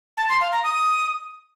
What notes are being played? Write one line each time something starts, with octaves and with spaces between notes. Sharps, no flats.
A5
C6
F5
A#5
D#6